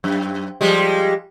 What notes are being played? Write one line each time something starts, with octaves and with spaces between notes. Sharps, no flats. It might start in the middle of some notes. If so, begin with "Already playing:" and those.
F#2
F3 G3 G#3